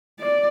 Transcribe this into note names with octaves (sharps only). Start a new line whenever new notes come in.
D5